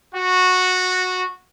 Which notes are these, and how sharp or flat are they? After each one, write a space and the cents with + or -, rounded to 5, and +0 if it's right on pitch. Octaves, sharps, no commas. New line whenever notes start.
F#4 -10